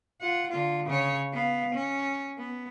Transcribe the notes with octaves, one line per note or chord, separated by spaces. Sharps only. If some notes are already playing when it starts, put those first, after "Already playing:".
F4 F#5
D3 F4
C#3 C#5
B3 F5
C#4
B3